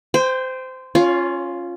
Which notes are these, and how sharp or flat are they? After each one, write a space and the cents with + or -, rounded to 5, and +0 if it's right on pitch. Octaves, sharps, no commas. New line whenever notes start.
C5 -20 G5 +20
C#4 -5 F4 +0 C#5 +35